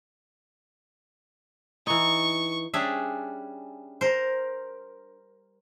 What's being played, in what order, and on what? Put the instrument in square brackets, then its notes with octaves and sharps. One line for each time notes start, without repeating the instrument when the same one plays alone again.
[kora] E3 D#4 [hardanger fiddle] C#6
[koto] G3 C#4 D4 G#4 E5
A#4 C5